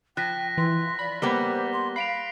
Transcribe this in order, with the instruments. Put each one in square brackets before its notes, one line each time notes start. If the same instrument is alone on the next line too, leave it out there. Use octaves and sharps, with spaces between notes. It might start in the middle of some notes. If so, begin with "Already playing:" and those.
[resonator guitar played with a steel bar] F3 [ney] G5 [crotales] F#6 A#6 B6
[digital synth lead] E3 [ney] C6
[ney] D5 [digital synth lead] B5
[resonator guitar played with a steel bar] G3 A#3 B3 [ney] C5 [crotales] G7
[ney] C6
[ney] F5 [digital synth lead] B5 [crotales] C7 D7 F7